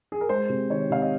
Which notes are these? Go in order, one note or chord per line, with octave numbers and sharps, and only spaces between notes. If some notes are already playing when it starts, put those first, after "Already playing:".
G#4
A#4
G#3 C5
C3
D#3 C#5
C3 F5
D#5